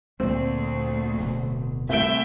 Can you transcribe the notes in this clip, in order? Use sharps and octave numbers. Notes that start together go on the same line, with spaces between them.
D2 A#2 A3 A#3 C4
D1 B2 D3
C2 A3 E5 G6 D7